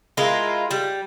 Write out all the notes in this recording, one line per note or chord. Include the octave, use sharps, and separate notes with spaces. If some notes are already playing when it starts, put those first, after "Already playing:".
G#3 E4 F4 A#4
G3